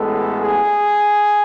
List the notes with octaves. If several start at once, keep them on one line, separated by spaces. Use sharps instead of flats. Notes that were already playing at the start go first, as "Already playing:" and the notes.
Already playing: A1 A2 G#3 B3 A4
G#4